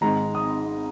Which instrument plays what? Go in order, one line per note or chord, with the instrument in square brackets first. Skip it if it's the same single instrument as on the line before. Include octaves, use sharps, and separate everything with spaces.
[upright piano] G#1 G#2 G#3 A#5
D#6